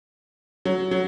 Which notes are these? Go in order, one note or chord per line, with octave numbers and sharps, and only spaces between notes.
F#3
F#3